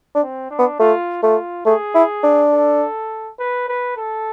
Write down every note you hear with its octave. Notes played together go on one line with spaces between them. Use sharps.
D4
C4
D4
B3
A3 F4
A3 F4
A3 G#4
E4
D4
A4
B4
B4
A4